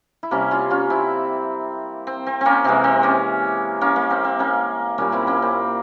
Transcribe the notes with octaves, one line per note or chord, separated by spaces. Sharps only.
E4
C3 G3 A#3 C#4
C#4 F4
C#4 F4
C4 E4
C4
C4
A#3 C4 C#4
C3 E3 G#3 C4
C4
A#3 C#4
A#3 C#4
A#3
C4
C4
A#3 C#4
A#2 G3 A#3 C#4
C4 E4
A#3 C#4
C4